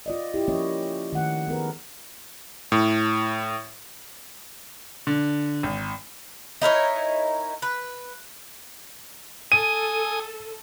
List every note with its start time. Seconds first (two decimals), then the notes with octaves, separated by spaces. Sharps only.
0.06 F4 D5 D#5
0.34 E4 G4
0.48 F3 A#3 C#4 C#5 D#5
1.13 D#3 A3 F#5
1.48 B3 G#4 A#4 B4
2.72 A2
5.07 D3
5.63 G#1
6.61 D#4 E4 A#4 C#5
7.62 B4
9.52 A4 G#5 D#6 D#7